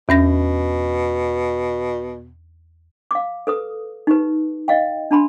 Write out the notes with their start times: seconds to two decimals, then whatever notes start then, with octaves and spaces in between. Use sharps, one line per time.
0.09 E2 B2 C#4 A#6
3.11 F5 D6
3.47 A4 B4 D#6
4.07 D#4 G4 B4
4.68 D#5 F5 G5
5.11 D4 A5 B5 C6